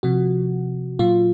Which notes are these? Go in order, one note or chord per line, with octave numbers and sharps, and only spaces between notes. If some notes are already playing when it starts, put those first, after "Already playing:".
C3 F3 F#4
A#2 F#3 F4